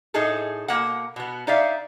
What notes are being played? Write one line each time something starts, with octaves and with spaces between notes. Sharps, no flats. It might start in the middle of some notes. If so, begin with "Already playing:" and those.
A2 D#4 G#4 A4
B2 A#3 F#5
B2 B3
D#4 D5 E5 F5